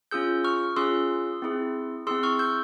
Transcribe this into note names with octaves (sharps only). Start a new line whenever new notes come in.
C#4 F4 G#4 E6 G6
C#6 F6
C#4 F4 G#4 C6 E6
C4 E4 G#4
C4 E4 G#4 C6 E6
C#6 F6
E6 G6